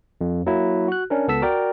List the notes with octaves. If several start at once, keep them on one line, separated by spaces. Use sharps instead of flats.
F2
F#3 A#3 E4
F#4 F#6
C#4 D4 A#4
C#2 B3 A4 A5 E6 B6
F#4 A#4 D5 G5